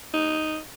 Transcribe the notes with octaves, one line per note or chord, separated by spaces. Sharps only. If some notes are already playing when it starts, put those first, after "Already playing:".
D#4